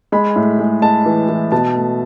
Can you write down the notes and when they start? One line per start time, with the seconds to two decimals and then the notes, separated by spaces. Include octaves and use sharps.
0.12 G#3 B5
0.36 A2
0.59 G#3
0.82 G#3 A5
1.06 E3
1.29 E3
1.52 B2 A5
1.75 A3